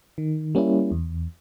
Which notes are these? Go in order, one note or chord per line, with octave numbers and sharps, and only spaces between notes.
D#3
G3 A#3 C#4 E4
E2